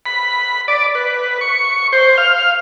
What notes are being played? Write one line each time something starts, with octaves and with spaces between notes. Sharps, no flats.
B5
D5
B4
C#6
C5
F5